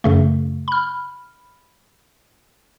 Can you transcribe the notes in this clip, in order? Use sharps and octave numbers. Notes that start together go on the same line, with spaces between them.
F#2 C#3 A3
B5 F6